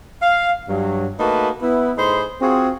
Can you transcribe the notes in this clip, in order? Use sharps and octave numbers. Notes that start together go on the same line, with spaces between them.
F5
G2 F#3
A3 A#3 D#4 F#4 B4 A5
B3 E4
A2 D#4 G#4 C5 B5 C6
C4 F4 F#4 G#4